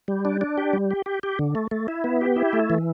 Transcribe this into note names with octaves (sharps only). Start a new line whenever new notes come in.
G3
D4
D4
G4
G3
G4
G4
G4
D3
A3
A3
E4
B3
G4
E4
A3
E3